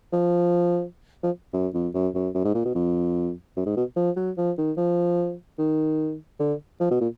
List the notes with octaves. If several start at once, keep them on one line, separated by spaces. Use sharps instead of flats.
F3
F3
F#2
F2
F#2
F#2
F#2
G#2
A#2
B2
F2
F#2
G#2
B2
F3
F#3
F3
D#3
F3
D#3
D3
F3
B2
A#2